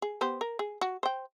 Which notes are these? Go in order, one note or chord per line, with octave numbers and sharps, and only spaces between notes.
G#4
B3 G4 C5
A#4
G#4
F#4
C5 G5